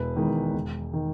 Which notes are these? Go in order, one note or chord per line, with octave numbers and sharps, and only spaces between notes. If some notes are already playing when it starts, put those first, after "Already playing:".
Already playing: E1 B4
E2 D#3 G#3
E1
D#3